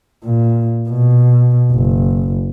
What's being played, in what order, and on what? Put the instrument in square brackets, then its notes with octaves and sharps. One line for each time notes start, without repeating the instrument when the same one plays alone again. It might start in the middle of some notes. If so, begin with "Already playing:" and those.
[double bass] A#2
B2
F#1